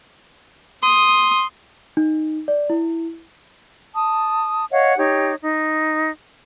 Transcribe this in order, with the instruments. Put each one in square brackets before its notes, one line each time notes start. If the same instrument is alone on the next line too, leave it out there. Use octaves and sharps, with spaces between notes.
[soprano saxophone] C6 [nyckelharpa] D#6
[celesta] D#4
D5
E4
[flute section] A5 D#6
C#5 D#5 F5 F#5
D#4 G4 C#5
D#4